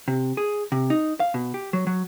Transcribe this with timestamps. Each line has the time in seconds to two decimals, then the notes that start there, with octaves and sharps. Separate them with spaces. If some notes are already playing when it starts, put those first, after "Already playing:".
0.08 C3
0.37 G#4
0.72 C3
0.90 D#4
1.20 F5
1.34 B2
1.54 G4
1.73 F#3
1.87 F#3